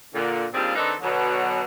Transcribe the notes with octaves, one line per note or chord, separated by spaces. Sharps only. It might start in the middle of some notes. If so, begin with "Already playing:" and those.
A#2 D3
D#2 G3 C4 D4 F4 G#4
D#3 C4 D4 D#4 A4 B4
B2 D3 F#3